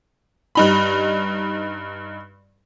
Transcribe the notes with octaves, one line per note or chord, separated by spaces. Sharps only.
G2 D#4 B5